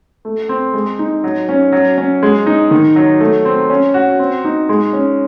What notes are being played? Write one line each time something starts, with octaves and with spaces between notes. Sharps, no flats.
A3
C4
G#3
D#4
F#3
C#4
F#3
C#4
G#3
D#4
D#3
F#3
A3
C4
C#4
F#4
C4
D#4
G#3
C#4